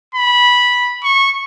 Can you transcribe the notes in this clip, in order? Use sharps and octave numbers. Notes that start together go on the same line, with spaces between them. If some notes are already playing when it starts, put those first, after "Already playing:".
B5
C#6